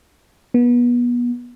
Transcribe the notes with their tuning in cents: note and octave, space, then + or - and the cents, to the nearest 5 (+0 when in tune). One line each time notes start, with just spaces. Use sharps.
B3 -30